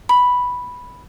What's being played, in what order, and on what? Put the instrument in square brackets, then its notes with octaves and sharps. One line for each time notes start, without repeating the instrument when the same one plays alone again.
[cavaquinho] B5